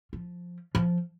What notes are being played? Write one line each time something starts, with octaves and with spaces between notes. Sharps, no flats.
F3
F3